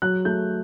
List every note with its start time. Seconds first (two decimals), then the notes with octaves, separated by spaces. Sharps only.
0.02 F#3 F#6
0.25 A3 G6